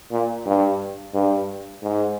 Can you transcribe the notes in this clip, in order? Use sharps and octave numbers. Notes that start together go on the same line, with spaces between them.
A#2
G2
G2
G#2